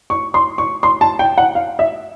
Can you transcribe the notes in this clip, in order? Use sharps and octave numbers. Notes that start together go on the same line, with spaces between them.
C#6
C6
C#6
C6
A5
G5
F#5
F5
E5